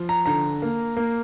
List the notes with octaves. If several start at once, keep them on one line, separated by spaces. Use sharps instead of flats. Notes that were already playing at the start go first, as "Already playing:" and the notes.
Already playing: F3
A#5
D3 A#5
A#3
A#3